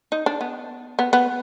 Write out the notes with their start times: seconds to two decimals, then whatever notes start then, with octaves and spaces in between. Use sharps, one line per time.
0.12 D#4
0.26 D4
0.41 B3
0.99 B3
1.13 B3